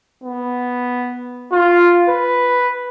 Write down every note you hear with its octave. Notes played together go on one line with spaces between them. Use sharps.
B3
F4
B4